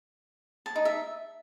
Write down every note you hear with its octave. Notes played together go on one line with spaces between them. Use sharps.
A5
D#4
E5